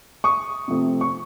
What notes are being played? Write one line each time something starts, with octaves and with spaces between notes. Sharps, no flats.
C#6 D#6
C3 F3 A3 C4
C#6